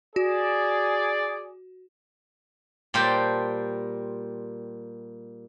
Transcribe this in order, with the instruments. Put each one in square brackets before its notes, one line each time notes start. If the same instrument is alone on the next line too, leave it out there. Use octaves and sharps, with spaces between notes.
[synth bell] F#4 [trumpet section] G#4 D5
[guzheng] A#2 G3 C5 G5 A5